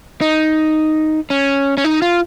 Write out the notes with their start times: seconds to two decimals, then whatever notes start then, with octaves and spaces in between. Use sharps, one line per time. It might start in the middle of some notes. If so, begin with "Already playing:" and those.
0.21 D#4
1.30 C#4
1.78 C#4
1.84 D#4
2.02 F4